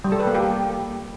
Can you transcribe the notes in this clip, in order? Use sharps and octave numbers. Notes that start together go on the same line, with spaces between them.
G3
A4
B4
A#3
G4